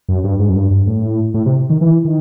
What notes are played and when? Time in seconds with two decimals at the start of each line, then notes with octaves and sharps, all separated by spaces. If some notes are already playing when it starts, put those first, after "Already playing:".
0.09 F#2
0.24 G2
0.39 G#2
0.49 F#2
0.56 G2
0.71 G2
0.87 A2
1.34 A2
1.46 C3
1.70 D#3
1.81 E3
2.05 D#3